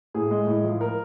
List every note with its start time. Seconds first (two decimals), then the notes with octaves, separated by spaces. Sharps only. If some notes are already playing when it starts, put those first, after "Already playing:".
0.14 A2 G#4
0.31 G#3
0.47 A2
0.64 F3
0.81 A#4